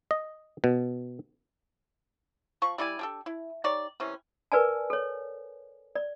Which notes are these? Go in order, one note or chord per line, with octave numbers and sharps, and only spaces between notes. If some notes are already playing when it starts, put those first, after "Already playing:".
D#5
B2
F3 C#6
G3 E4 D5 G#5
D4 G4 A4
E4
D#4 G4 C#5 D5
C3 E3 C#4
A#4 B4 D5 G#5 A5
A4 C#5
D5